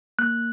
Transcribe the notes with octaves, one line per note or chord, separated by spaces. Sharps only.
A#3 F#6